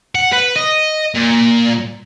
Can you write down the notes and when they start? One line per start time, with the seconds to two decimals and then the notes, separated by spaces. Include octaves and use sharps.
0.15 F#5
0.32 B4
0.56 D#5
1.15 A#2